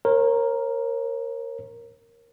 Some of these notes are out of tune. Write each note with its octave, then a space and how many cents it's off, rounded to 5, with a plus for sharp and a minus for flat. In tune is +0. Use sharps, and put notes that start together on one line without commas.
A#4 +0 C#5 -40